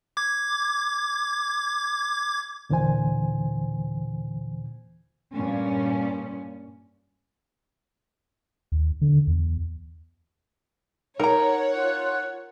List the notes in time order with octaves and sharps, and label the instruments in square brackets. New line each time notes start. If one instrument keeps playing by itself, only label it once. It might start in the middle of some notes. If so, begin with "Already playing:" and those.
[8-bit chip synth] D6 G#6
[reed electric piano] D#2 A#2 D3 E3 C5 G#5
[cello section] G2 A#2 C#4
[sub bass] D#2
D3
E2
[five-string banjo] D#4 A#5 [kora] A#4 [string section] C#5 F#5
[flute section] F4 F#6